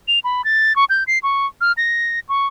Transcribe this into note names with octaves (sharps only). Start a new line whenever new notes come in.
F7
B5
A6
C#6
G6
C7
C#6
F6
A#6
C#6